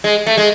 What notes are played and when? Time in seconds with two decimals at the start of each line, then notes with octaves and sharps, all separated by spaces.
0.04 G#3
0.27 A3
0.38 G#3